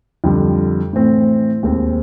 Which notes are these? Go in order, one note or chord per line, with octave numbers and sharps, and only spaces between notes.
F2 D3 G3
A2 E3 A3 C4
D#2 D#3 G#3 C4